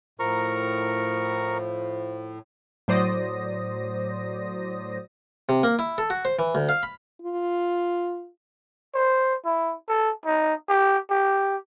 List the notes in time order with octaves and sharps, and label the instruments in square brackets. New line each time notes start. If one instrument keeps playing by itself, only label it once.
[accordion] A2 [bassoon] F3 [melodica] A#4 A#5 C#6
[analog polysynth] A2 F#3 C5 D5 D#6 A#6
[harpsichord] C3
A#3
E4
A4
F#4
C5
E3
D2
F5
B5
[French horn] F4
[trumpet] C5
E4
A4
D#4
G4
G4